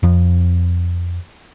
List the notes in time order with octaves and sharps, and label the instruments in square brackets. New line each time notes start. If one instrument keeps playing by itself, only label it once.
[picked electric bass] F2 F3